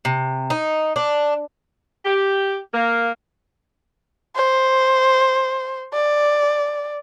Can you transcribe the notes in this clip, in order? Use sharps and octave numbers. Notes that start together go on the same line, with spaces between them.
C3
D#4
D4
G4
A#3
C5
D5